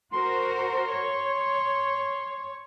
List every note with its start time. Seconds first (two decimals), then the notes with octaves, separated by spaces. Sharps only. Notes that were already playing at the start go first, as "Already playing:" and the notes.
0.13 F#4 A#4 C5 C6
0.90 C#5